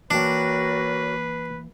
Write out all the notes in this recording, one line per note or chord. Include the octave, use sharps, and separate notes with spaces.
E3 A#3 D4 F#4 A#4 B4 C#5 G5